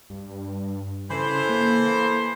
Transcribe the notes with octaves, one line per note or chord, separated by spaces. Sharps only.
G2
C#3 E3 A4 C5
A#3